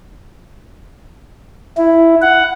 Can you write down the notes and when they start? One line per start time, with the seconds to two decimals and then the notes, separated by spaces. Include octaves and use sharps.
1.77 E4
2.22 F#5